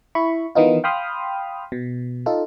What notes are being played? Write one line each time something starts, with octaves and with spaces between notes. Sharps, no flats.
E4 B5 C#6
D#3 E3 B3 D#4 F4
F5 G5 B5 C6 D#6 F6
B2
D#4 F4 A4